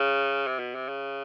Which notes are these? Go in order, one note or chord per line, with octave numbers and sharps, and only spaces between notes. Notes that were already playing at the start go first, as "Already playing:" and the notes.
Already playing: C#3
C3
B2
C3
C#3